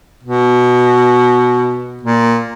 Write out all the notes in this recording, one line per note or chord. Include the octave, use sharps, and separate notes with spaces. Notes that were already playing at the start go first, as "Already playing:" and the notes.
B2
A#2